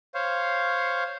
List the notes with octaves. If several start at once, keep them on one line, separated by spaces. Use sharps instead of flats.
C5 C#5 F5